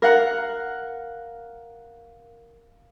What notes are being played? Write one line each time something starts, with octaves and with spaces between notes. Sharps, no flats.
A#4 F5 F#5